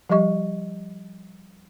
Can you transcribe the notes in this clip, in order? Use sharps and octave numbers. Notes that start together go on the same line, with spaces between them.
F3 G3 G4 D#5 C#6